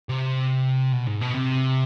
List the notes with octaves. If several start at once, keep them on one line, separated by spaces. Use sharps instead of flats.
C3
B2
G#2
B2
C3